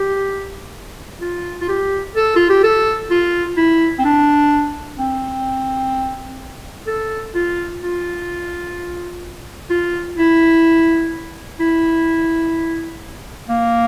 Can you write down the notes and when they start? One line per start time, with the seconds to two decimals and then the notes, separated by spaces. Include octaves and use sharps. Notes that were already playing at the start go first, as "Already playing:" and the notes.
Already playing: G4
1.21 F4
1.61 F4
1.69 G4
2.16 A4
2.36 F4
2.50 G4
2.63 A4
3.11 F4
3.57 E4
3.99 C4
4.05 D4
4.98 C4
6.87 A4
7.35 F4
7.82 F4
9.70 F4
10.18 E4
11.60 E4
13.49 A#3